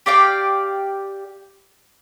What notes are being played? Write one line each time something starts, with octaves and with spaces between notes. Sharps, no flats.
G4 D5 F5 G5